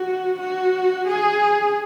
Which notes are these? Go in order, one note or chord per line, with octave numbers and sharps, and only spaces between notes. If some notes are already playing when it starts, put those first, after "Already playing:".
Already playing: F#4
F#4
G#4